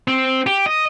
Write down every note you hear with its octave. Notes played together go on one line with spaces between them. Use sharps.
C4
G4
D#5